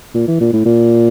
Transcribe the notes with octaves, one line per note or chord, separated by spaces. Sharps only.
A#2
E3
A#2
A2
A#2